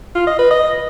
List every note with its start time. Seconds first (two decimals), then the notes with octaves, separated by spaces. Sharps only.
0.15 F4
0.27 D#5
0.39 B4
0.51 D#5